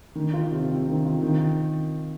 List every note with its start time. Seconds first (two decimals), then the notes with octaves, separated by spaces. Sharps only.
0.15 D#3
0.34 F4
0.51 C3
0.69 C4
0.87 D#3
1.05 F4
1.23 D#3